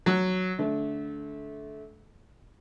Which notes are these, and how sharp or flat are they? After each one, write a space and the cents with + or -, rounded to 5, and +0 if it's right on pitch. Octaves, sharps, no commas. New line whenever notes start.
F#3 +0 F#4 +0
D3 -25 A3 -25